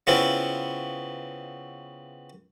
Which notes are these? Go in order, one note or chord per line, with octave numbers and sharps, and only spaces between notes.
C#3 B3 C4 E4 F4